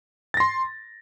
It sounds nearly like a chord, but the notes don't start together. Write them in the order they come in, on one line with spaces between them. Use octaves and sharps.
A6 A#6 C6